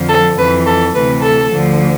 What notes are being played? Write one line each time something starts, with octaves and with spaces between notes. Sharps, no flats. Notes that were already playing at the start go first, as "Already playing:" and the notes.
Already playing: F2 D3 F3
A4
F2 E3 B4
A4
D2 C3 E3 B4
A4
D2 D3 F3